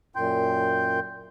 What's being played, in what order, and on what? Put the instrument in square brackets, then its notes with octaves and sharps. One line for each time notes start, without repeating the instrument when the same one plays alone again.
[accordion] F#2 A#2 G5 C6 G6